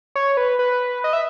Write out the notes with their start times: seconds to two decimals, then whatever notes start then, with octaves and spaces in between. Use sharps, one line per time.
0.15 C#5
0.37 B4
0.59 B4
1.04 D#5
1.13 E5